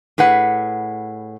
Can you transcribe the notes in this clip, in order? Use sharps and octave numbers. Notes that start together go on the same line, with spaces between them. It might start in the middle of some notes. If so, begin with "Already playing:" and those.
A2 G#4 B4 F#5